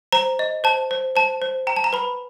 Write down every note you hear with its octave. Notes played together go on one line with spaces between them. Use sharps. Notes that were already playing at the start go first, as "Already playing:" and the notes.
C5 A#5
D#5
C5 A5
C5
C5 A5
C5
G5 A#5
A5
A#5
B4 B5